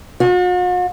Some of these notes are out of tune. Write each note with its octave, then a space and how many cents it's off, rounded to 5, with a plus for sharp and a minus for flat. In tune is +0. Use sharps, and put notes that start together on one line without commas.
F#4 -45